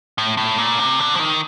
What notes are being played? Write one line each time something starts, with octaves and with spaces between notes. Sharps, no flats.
A2
A2
A#2
C3
D3
F3
D#3